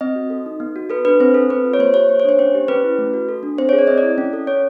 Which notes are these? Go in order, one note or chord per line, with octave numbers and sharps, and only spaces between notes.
C4 D#5
F#4
A4
D#4
B3
F#4
A4 B4
D4 B4
C4 C5
A4
C4 B4
F4
C#5
A#3 C5
G4 C#5
A#3 C5
C#5
D4 C5
C#4 C5
G4
C#4 B4
E4
A3
F#4
A4
D4
C4 C5
C#5
G#4
D5
C4 D#5
D5
E4
C#4
A4
C#4 C#5